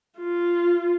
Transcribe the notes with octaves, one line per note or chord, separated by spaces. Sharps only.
F4